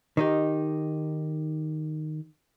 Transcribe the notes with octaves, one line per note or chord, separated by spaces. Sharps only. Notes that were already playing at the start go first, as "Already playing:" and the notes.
D#3 D#4 G4